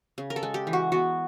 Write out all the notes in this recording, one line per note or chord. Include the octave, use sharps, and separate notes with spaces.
C#3
A#4
A4
G#3
G4
E3
F#4
B3 F#4